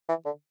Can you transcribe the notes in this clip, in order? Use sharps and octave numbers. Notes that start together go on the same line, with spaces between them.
E3
D3